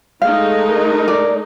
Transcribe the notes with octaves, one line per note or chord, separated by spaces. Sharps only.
G#3 A3 D#4 F5
A#4
D5